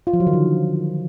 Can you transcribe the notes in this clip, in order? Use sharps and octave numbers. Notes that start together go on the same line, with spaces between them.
F4
F3
F#3
D#3
D3